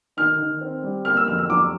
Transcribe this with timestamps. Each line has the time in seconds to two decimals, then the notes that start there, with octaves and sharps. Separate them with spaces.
0.17 D#3 F6
0.39 D#3
0.61 C4
0.83 G3
1.05 A#3 F6
1.17 E6
1.27 F2 F6
1.38 E6
1.49 F#3 D6